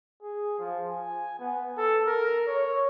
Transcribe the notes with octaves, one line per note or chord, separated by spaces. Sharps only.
G#4
F3
G#5
B3
A4
A#4
C#5